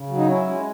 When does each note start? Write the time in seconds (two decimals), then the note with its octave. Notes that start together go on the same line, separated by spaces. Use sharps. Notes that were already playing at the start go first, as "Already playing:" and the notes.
Already playing: C#3
0.08 F#3
0.17 D#4
0.27 C#4 E4
0.46 G#3